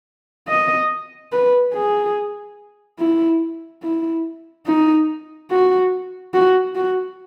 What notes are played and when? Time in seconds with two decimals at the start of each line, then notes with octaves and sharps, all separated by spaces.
0.48 D#5
1.32 B4
1.74 G#4
2.99 E4
3.83 E4
4.67 D#4
5.51 F#4
6.34 F#4
6.75 F#4